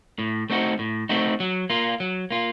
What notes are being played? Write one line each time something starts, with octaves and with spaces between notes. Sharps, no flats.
A2
A3 C4 D#4 F#4
A2
A3 C4 D#4 F#4
F#3
A#3 F4
F#3
A#3 F4